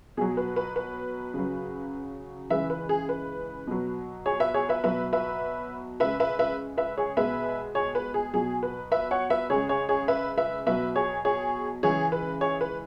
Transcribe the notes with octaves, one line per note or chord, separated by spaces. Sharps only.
B2 F#3 G#4
B4
B4
B4
C#3 F#3
C#3 E3 G#3 B4 E5
B4
G#4
B4
B2 F#3
G#4 C#5
B4 E5
G#4 C#5
B4 E5
B2 F#3 B4 E5
B4 E5
C#3 G#3 B4 E5
B4 E5
B4 E5
B4 E5
G#4 C#5
B2 G#3 B4 E5
G#4 C#5
B4
G#4
B2 F#3 G#4
B4
B4 E5
C#5 F#5
B4 E5
C#3 G#3 G#4 C#5
G#4 C#5
G#4 C#5
B4 E5
B4 E5
B2 F#3 B4 E5
G#4 C#5
G#4 C#5
C#3 E3 G#3 G#4 C#5
B4
G#4 C#5
B4